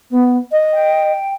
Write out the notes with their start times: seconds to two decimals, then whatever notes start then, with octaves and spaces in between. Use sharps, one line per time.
0.11 B3
0.52 D#5
0.73 G5